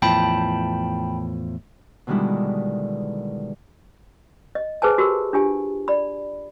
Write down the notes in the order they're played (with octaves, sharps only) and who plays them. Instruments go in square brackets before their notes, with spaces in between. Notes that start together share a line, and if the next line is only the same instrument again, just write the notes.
[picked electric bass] E2 A2 F3 [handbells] G5 A5 B5
[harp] B2 D3 D#3 G3 G#3 E4
[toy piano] D#5
G#4 B4 C5 G#5 A5
F#4 G4 A#4
D4 F4 G4 G#5
D5 B5